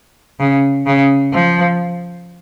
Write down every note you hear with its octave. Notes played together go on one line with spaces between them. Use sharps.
C#3
C#3
F3